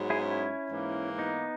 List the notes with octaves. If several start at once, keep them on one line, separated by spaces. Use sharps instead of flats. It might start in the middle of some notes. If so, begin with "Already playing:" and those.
Already playing: G#2 F#3 B3
E4 G#4
C#4 E4
G#2 E3 A#3
B3 D#4